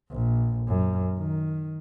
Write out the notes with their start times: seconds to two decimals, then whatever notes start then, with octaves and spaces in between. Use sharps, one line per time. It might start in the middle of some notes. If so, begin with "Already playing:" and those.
0.10 A#1
0.68 F#2
1.17 D#3